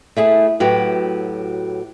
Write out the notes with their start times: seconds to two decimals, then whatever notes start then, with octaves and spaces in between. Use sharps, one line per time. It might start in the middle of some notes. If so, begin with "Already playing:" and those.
0.17 A3 E4 G#4
0.60 A2 F#3 F#4 G4 B4